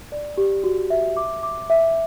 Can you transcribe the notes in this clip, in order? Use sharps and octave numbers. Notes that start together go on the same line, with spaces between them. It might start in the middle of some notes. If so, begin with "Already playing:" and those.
D5
G4
F#4
E5
D6
D6
E5